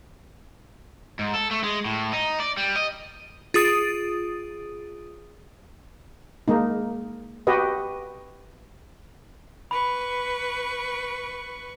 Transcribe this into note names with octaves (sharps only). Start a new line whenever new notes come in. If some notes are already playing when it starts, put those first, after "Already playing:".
G#2
A4
A3
G#3
A2
D#4
D5
G3
D#5
F4 G#4 D#6 A6 D7 D#7
G#3 A#3 D#4
F#4 G4 B4 D#5
B4 B5 C#6